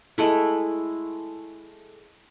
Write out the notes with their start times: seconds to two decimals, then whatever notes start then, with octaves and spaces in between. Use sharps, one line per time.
0.18 G#3 A3 E4